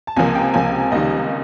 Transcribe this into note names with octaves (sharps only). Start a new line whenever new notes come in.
A5
C#2 C3 F3 A#3 G#5
G5
C#2 C3 F3 A#3 G#5
C#2 C3 D#3 G3 A#3 D#5